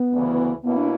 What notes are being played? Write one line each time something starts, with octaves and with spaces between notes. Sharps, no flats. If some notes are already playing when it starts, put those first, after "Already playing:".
Already playing: B3
D2 C#3 E3
B2 A#3 B3 C#4 E4
D4